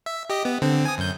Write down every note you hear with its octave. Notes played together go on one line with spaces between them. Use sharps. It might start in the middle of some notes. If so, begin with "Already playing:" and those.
E5
G4 D#5
B3
D3 C4
G#5 D#6
F#2 G6